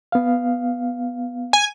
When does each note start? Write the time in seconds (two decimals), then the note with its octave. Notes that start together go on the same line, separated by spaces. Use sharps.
0.12 B3 F5
1.53 G#5